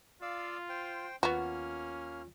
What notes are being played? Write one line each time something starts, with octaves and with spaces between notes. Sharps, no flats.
F4 D5 F5 E6
C5 G5
D#2 A#3 B3 C#4 F4 F#4 F6